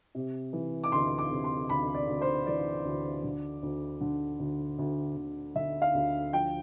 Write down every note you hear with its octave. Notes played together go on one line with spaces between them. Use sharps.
C3
E3
D6
D2 C6
D6
C3
C6
D2 B5
D5
D2
C5
E3 D5
D2
D3
D2
D3
D2
D2
D2
D3 E5
F5
D2
F3 G5